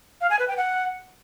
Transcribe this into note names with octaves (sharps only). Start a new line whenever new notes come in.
F5
G#5
B4
G5
F#5